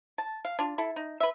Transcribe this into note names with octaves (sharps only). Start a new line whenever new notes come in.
A5
F5
D4 F4
E4 A4
D#4
B4 E5